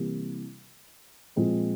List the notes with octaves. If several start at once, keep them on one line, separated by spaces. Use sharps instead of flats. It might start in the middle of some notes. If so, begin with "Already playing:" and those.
Already playing: C3 E3 G3 A#3
A#2 F3 G#3 C4